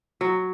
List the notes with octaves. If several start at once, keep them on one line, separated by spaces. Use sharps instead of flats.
F#3